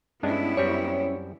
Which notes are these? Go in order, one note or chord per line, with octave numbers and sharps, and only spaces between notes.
G2 G#3 B3 C#4 D4 E4
F#2 G3 C4 C#5